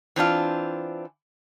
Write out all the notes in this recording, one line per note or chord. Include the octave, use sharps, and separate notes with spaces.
E3 C4 D4 F4